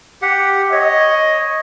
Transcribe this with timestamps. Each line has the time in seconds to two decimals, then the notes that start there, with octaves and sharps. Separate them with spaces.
0.22 G4 F#5
0.72 C#5 D#5